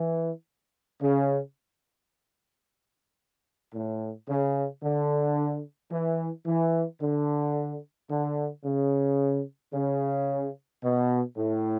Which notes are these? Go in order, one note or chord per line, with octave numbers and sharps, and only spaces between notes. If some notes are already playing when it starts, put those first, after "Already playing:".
Already playing: E3
C#3
A2
C#3
D3
E3
E3
D3
D3
C#3
C#3
B2
A2